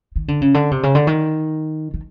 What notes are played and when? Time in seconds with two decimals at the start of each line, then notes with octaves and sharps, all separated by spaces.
0.16 D#3
0.28 D3
0.41 C#3
0.54 D3
0.71 C3
0.83 C#3
0.95 D3
1.07 D#3
1.94 D#3